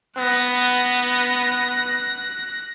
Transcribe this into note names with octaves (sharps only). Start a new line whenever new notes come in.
B3 F#6 A#6